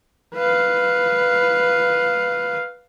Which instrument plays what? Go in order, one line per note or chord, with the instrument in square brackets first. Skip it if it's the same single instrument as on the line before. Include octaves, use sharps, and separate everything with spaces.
[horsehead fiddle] B4 F5